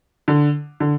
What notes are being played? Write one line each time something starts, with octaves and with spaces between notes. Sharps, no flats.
D3
D3